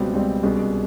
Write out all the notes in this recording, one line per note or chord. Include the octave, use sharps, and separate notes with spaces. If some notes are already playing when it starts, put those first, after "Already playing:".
Already playing: C#2 B2 G3 C4
C#2 B2 G3 C4
C2 B2 G#3 C#4